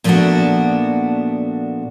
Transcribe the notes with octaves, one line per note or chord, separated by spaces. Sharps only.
A#2 F3 A3 B3 D4 F#4